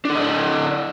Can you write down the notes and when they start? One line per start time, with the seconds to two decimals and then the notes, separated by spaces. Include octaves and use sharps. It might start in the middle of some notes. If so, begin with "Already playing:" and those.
0.05 D4
0.10 A4
0.15 D#5
0.20 D5